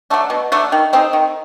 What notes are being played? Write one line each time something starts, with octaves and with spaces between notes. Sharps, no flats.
F#3 A3 D4
B2
F#3 A3 D4
D#3
G#3 C4 D#4
D#3